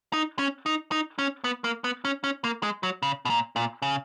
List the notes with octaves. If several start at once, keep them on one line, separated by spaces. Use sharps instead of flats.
D#4
C#4
D#4
D#4
C#4
B3
A#3
B3
C#4
C#4
A#3
G#3
F#3
C#3
B2
A#2
A#2
C#3